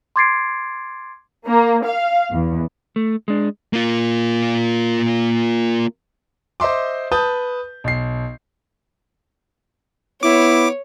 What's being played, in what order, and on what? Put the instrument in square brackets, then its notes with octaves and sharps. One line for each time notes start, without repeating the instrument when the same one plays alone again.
[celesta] C6 D6 G#6 A6 C7 D7
[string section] A#3
F5
E2
[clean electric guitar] A3
G#3 D4
[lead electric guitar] A#3 F4
[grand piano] C5 D#5 E5 C6 D6
B4 A5 D#6 G6
B1 C7
[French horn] B3 [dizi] E4 [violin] C#5 [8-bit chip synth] D6